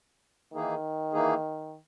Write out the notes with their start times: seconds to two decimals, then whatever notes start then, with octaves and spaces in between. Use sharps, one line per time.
0.53 D#3 E3 A#3 D#4 G#4
1.13 E3 A#3 D#4 G#4